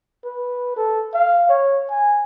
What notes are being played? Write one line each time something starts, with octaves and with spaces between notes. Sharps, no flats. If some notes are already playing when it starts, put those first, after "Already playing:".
B4
A4
F5
C#5
G#5